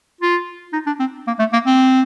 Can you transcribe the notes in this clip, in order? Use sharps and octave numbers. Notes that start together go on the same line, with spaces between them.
F4
D#4
D4
C4
A#3
A3
A#3
C4